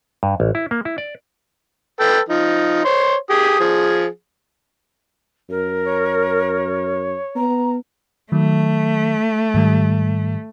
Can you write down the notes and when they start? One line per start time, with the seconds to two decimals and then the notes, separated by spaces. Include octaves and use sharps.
0.23 G2
0.40 A1
0.55 E4
0.71 A#3
0.85 E4
0.98 D5
2.00 A4 B4 G5
2.29 F3 D#4
2.85 C5 C#5 C6
3.30 G4 G#4 D#6
3.60 F3 G#4
5.50 F#2 A#4
5.85 C#5
7.36 B3 A#5
8.32 D#3 F#3 A3
9.54 G#2 D#3 G3